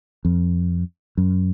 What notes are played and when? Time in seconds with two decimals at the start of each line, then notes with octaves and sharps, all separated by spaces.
0.25 F2
1.17 F#2